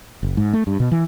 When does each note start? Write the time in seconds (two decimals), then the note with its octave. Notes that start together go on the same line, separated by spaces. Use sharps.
0.23 F#1
0.37 G#2
0.53 A3
0.67 G2
0.80 B2
0.92 E3